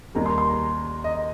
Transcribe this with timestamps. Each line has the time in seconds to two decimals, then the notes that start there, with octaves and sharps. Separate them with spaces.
0.15 D#2 D#3 G3 A#5
0.26 C6
0.38 C6
0.49 A#5
1.04 D#5